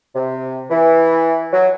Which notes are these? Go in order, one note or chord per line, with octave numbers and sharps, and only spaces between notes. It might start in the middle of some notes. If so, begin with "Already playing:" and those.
C3
E3
F#3